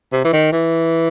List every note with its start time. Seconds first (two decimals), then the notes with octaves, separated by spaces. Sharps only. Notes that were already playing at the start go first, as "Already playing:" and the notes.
0.12 C3
0.25 E3
0.33 D#3
0.52 E3